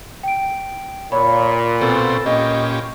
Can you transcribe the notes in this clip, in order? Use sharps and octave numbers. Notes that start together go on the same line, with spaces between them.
G5 D7
A#2 C#5 B5
B2 C4 A4
A#2 C#4 G4 D#5